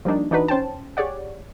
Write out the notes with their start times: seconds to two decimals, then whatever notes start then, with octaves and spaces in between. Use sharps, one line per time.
0.05 F3 G3 A#3 D4 D#4
0.31 E3 D4 D#4 F#4 B4
0.48 C#4 C5 G5 A5
0.97 G4 G#4 C#5 D5 F#5